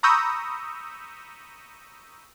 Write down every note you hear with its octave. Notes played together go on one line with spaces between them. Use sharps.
A#5 B5 C#6 D#6 E6 G6